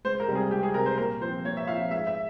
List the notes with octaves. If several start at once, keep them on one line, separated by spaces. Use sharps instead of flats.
C#2 C5
A#4
C3 G3 C4
G#4
C#2 G4
G#4
C3 G3 C4 A#4
C5
A#2 A#4
F3 C4 C5
A#2 C#5
E5
F3 C4 F5
E5
G#2 E5
E5